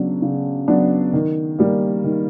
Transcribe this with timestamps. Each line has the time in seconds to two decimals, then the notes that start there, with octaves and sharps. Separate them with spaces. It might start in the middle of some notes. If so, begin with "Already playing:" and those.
Already playing: C#3 F#3 B3 D4
0.22 C#3
0.68 F#3 B3 D4
1.13 D#3
1.59 G3 A#3
2.04 D#3